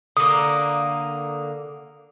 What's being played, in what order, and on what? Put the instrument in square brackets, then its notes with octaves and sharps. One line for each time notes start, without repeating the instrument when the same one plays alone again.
[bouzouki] D3 A#3 [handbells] D#6